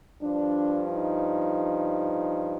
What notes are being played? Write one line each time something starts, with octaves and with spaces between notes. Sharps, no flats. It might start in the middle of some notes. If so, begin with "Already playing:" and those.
G2 F3 D4
D#4